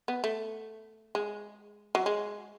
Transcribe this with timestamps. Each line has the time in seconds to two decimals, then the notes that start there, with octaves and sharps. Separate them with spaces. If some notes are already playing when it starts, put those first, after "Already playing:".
0.08 B3
0.24 A3
1.15 G#3
1.95 F#3
2.06 G#3